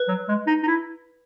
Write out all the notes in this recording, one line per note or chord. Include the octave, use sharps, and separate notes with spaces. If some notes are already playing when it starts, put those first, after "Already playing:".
Already playing: B4
F#3
G#3
D#4
D#4
E4